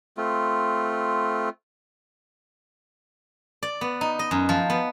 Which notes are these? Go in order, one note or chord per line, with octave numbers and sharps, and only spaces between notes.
A3 C4 F4
D5
B3
D#4
D#5
F#2
F3
B3